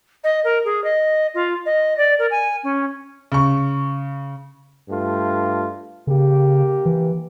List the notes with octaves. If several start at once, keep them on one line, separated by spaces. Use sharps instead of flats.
D#5
A#4
G#4
D#5
F4
D#5
D5
A#4
G#5
C#4
C#3 C#6
G2 A3 F4
C#3 A#3 G4
E3